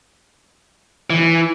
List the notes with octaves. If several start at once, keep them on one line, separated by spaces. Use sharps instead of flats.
E3